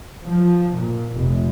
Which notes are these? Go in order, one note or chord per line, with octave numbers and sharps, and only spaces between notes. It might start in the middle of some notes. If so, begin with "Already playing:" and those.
F3
A#2
F1